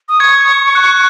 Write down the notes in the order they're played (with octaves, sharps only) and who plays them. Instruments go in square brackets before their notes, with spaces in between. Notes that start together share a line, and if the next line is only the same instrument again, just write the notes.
[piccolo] D#6
[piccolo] C#6 [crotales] G#6
[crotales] G#6
F#6